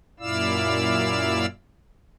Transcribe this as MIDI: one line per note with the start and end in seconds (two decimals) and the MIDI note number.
0.20 1.46 42
0.20 1.46 46
0.20 1.46 64
0.20 1.46 74
0.20 1.46 77
0.20 1.46 88